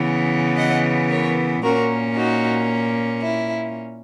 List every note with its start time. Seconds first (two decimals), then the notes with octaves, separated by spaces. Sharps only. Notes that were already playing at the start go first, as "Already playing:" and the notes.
Already playing: C#3 E3 B3
0.57 D#5 F#5
1.09 A#4 C#5
1.63 A#2 A#3 C#4 F#4 A#4
2.16 D#4 F#4
3.22 E4